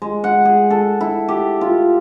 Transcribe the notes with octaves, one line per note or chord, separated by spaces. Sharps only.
G#3
F#5
G#4
A4
E4
G4
F4